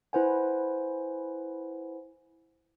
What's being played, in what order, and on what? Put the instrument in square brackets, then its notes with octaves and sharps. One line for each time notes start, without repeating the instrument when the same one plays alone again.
[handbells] E4 B4 C5 F#5 G#5